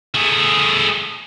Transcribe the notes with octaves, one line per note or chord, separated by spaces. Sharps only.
A3 G#4